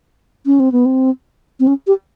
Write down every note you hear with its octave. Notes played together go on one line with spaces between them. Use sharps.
C#4
C4
B3
C4
C4
C#4
G4